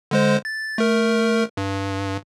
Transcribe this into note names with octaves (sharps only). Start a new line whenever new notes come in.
D3 G#3 C5
A6
A3 A#4
G2